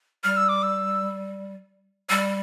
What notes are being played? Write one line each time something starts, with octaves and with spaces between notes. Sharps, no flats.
G3 F6
E6
D6
E6
G3 E6